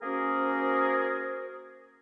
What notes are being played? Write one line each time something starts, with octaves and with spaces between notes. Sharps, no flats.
A#3 C#4 F#4 G#4 A#4 C5